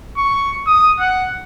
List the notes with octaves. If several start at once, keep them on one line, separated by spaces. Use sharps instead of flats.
C#6
D#6
F#5